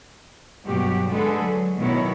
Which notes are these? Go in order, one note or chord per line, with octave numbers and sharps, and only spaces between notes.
G2 B2 F#3 F#4 G4
D3 G#3 G#4 A4 B4
F#3
B2 D#3 F#3 E4 C#5